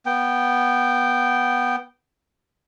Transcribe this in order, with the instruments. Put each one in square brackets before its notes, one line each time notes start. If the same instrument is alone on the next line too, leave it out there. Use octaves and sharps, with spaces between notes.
[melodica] B3 G5